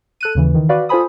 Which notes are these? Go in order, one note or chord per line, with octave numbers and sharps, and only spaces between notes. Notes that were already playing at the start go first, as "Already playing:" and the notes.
A4 F#6 D#7
D#2 C#3 E3
D#3 E3
F#4 B4 D5 F5
F4 A4 C5 G#5 B5 D#6